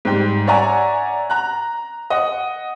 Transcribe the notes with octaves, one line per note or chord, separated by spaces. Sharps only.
G#2 G3 G5
C#5 D5 E5 F#5 G#5 A#5
A#5 F#6
D#5 F#5